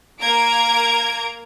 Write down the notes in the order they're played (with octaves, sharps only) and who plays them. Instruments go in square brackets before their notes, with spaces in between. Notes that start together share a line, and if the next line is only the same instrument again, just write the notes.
[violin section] A#3 A#5 G#6 D7